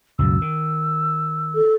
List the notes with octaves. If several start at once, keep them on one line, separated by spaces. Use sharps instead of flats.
C#2 F#2 B2 E6
D#3
A4